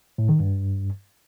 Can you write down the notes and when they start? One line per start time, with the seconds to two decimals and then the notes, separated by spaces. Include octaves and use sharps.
0.18 A2
0.29 D#3
0.40 G2